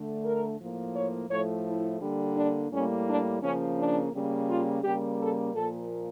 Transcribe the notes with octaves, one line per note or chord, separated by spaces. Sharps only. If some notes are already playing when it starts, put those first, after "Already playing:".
Already playing: D3 A3
A#4
A2 F3 A#3
C#5
A2 F3 A3 C#5
E4
D3 G3 A#3
D4
A2 G3 A#3 C#4
D4
C#3 F3 A#3 C#4
D4
C#3 G3 A#3
F4
C#3 G3 A#3 G4
A4
A#2 F3 A#3 A4